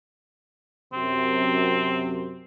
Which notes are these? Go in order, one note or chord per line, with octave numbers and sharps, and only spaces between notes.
F#2 C3 C4